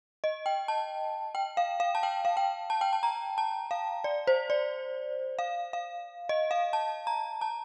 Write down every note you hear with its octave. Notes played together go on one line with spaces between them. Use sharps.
D#5
G5
A5
G5
F5
F5
A5
G5
F5
G5
A5
G5
A5
A#5
A5
F5
D5
C5
D5
F5
F5
D#5
F5
A5
A#5
A5